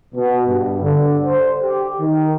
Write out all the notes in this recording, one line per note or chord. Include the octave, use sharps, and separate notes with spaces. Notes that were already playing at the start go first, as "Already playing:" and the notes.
B2
G2
D3
C5
G4
D#3